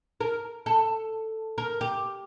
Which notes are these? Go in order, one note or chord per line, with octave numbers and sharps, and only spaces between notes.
A#4
A4
A#4
G4